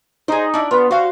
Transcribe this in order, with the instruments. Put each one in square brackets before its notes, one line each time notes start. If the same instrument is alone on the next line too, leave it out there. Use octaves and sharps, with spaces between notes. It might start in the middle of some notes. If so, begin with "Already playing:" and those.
[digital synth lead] D#4 [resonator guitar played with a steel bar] G#4 C5
[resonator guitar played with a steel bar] D4 E4
[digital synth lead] B3 [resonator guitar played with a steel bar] F4
[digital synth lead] F#4 [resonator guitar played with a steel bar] C5 F5